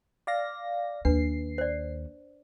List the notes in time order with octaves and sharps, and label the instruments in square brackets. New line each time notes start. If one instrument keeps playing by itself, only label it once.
[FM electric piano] D5 F5 A#6
[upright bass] D#2 [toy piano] D4 B4 [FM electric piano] C7
[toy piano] C5 D5